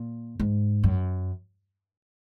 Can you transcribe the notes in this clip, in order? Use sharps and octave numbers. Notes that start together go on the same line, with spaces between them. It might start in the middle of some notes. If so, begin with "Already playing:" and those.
Already playing: A#2
G#2
F#2